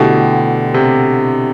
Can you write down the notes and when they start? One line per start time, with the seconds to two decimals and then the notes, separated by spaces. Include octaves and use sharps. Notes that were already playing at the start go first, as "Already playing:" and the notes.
Already playing: B2 D3 A3 E4 G4
0.74 C3